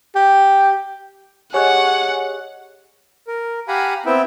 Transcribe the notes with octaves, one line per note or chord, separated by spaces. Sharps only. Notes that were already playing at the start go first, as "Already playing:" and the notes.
G4
G4 G#4 C#5 D#5 F#5 G#5 C#6 F#6
A#4
G4 F5 F#5 G#5 A#5 B5
B3 C4 E4 E5 G5